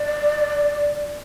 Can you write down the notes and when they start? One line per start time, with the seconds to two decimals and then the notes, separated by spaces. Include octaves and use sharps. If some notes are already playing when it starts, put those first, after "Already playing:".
Already playing: D5